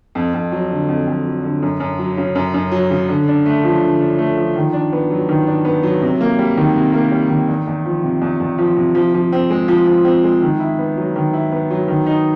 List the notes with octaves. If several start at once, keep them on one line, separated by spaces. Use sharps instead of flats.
F2
F2
F#3
D3
F2
F2
F#3
D3
F#2
F#2
F#3
C#3
F#2
F#2
F#3
C#3
D3
D4
A3
F3
D3
D4
A3
F3
D#3
D4
B3
F#3
D#3
D4
B3
F#3
C3
A#3
G3
D#3
C3
A#3
G3
D#3
E2
E2
F3
C3
E2
E2
F3
C3
F3
F3
C4
G#3
F3
F3
C4
G#3
D#3
E4
B3
F#3
D#3
E4
B3
F#3
D#3
D#4